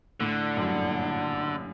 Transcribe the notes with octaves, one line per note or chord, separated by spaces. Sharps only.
A2 D3
F#2
G2
A2
A#2